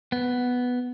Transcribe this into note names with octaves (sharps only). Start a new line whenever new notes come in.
B3